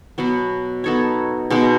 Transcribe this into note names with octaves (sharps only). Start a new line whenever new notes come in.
B2 F#3 B3
B3 D#4 A4 C#5
B2 G#3 D#4